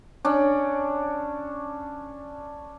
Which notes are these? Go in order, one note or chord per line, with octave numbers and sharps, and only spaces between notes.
C#4 D4